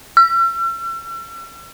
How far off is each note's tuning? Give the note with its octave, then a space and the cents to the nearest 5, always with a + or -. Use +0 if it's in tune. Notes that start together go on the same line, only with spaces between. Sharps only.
E6 +45